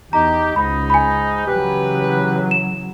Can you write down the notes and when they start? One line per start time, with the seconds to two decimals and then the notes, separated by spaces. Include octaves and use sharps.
0.13 E2 D#4 G4 A#5
0.56 C#2 G#2 G#3 D#4 B5
0.90 G#5 B5
1.47 C#3 E3 F#3 G4 B4
2.51 E7